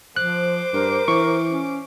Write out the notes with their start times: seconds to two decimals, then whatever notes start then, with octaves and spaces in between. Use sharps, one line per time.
0.17 F3 C5 D6 F#6
0.73 G2 A#4
1.08 E3 C#6
1.48 C#4